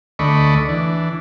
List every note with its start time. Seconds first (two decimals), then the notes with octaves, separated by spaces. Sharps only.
0.19 D2 A3 D5 D#5 B5 C#6
0.68 E3 D4